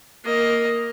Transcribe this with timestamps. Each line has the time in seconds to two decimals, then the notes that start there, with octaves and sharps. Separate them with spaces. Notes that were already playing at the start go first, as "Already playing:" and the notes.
0.24 A#3 D#5